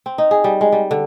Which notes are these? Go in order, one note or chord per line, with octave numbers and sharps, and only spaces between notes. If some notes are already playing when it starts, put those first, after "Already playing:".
C4
D#4
G#4
G3
G#3
G3
D3